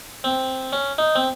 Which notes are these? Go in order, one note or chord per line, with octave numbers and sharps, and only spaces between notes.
C4
C#4
D#4
C4